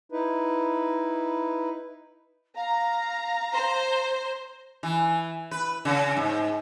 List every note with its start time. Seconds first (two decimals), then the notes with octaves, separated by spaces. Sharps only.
0.12 D#4 E4 B4
2.56 F5 A#5
3.54 C5
4.83 E3
5.51 B4
5.85 C#3
6.17 G#2